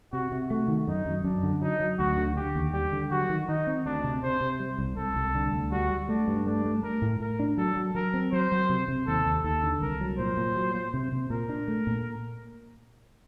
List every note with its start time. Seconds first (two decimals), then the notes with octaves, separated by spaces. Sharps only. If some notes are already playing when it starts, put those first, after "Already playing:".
0.12 C3 F#4
0.32 C3
0.50 A3 F#4
0.68 D#3
0.88 F#2 D#4
1.05 F#2
1.24 F#2 D4
1.43 D3
1.62 F#3 D#4
1.80 F#3
1.99 D2 F#4
2.17 D3
2.36 D3 G4
2.55 D#2
2.73 G3 G4
2.93 D3
3.11 F#3 F#4
3.29 D#3
3.48 D#3 D#4
3.67 C4
3.85 D2 D4
4.04 C3
4.23 C3 C5
4.41 C3
4.60 G3
4.78 C2
4.97 C2 A4
5.16 C2
5.35 D3
5.53 D2
5.71 G3 F#4
5.90 G3
6.09 A3 D4
6.28 G2
6.46 A3 D4
6.65 A3
6.83 A3 A#4
7.02 A2
7.20 A2 A#4
7.39 D4
7.58 F#3 A4
7.76 F#3
7.95 F#3 A#4
8.14 C4
8.32 F#3 C5
8.52 F#3
8.69 C3
8.88 C3
9.07 D#2 A4
9.26 D#2
9.44 D#2 A4
9.63 D3
9.81 C2 A#4
10.01 F#3
10.19 A#2 C5
10.37 A#2
10.56 F#3
10.75 A#3
10.94 C3
11.12 C3
11.30 A#2 A#4
11.49 D4
11.68 A3
11.87 A#2